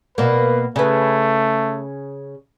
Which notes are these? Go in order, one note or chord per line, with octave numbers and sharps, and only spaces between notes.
B2 A#3 B4
C#3 A3 B4